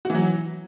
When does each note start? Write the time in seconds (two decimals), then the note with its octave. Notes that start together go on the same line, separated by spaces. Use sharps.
0.05 F#4
0.10 E3
0.15 F#3